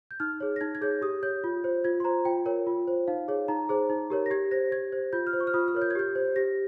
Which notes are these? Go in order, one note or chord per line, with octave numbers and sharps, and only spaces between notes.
G6
D#4 F6
G#4 C#5
A#6
D#4 G#6
G#6
G#4 C#5 G6
G4 D#6
C#5 G6
F4
C5
F4 G#6
C6
C5 A#5
F4 G5
A#4 C#5
F4
C5
D#4 F5
G#4 C#5
D#4 A#5
G#4 C5
D#4
G4 A#4 C#5
A#6
G4 G#6
C5 A#6
G4 G#6
C5
F4 G6
F6
C5
C#6
F6
F4 D#6
F6
A#4 C#5
G6
G#6
G4 G6
C5
G4 A#6